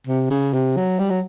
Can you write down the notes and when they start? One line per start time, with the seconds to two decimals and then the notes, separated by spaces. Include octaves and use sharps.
0.07 C3
0.30 C#3
0.53 C3
0.77 F#3
0.99 G3
1.10 F#3